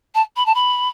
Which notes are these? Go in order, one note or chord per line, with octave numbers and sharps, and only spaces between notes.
A5
B5
A5
B5